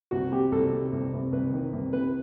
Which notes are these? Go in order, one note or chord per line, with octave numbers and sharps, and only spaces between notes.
C2 F#4
C3 G4
C2 A4
C3
C2
C2
C2 B4
D#3
C2
C3 B4